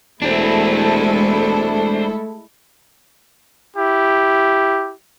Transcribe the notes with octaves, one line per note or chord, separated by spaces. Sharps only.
E1 G#3 A3 D4 E4 A4 C5
E4 G4